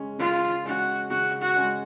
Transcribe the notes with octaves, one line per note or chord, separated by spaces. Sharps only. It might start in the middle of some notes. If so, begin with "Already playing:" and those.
Already playing: C#3 G#3 C#4
C#3 F4
G#3 C#4 F#4
C#3 F#4
F#4
G#3 C#4